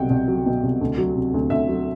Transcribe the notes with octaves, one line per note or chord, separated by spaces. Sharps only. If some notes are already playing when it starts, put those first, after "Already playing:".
Already playing: C2 B2 F#3 F#5 G5
C2
F#3
B2
C2
D2
F#3
C3
D2
D2 E5
F#3